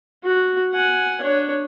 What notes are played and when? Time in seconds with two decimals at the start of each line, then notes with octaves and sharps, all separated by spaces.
0.24 F#4
0.73 F#5 G#5
1.21 D4 C#5